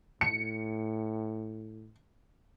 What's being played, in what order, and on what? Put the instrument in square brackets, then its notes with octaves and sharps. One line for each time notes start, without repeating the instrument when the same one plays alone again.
[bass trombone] A2 [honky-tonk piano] C#7